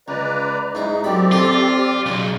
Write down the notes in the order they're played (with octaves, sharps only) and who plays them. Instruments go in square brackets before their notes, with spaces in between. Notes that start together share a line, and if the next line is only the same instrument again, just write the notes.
[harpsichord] C#2 [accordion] B4 D5 A#5
[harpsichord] G#2 E4 [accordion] D#4
[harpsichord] F#2 B5 [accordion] C4 G4 D5
[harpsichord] C3 A4 [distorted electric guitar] F4
[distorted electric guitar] B1 [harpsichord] C#3